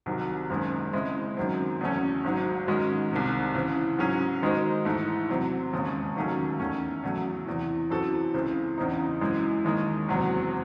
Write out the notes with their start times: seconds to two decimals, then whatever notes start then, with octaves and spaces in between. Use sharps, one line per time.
0.06 C2 C3 D#3 F#3
0.50 F#1 F#2 D#3 G#3
0.93 C#3 G#3 C4 E4
1.37 F#2 D#3 F#3 C4
1.81 E2 C#3 F#3 A3 C#4
2.24 G#1 G#2 F#3
2.67 G#2 D#3 G#3 C#4 F#4
3.11 C2 C3 D#3
3.55 C#3 E3 C4
3.98 G#2 F#3 C#4 G#4
4.42 D#3 G#3 D#4 F#4 C5
4.85 G#2 E3 A3
5.29 E2 C3 F#3 C4
5.73 E1 D#2 C#3 G#3
6.16 D#2 D#3 F#3 A3 C#4
6.59 E2 D#3 A3 C#4
7.03 E2 C#3 F#3 A3
7.47 E2 C3 E3
7.90 F#2 E3 C4 F#4 A4
8.34 C#2 C#3 E3 C4
8.78 E2 C#3 E3 C4 D#4
9.21 F#2 E3 G#3
9.65 D#2 D#3 G#3 D#4
10.08 F#1 E2 C3 F#3